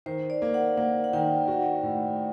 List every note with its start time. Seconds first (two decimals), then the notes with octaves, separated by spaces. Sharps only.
0.06 D#3 C5
0.30 D5
0.42 A#3
0.54 F#5
0.77 A#3 F#5
1.04 F#5
1.13 D#3 G5
1.48 F#4
1.83 A2